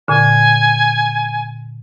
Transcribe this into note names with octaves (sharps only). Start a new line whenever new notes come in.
A#2 D3 G#5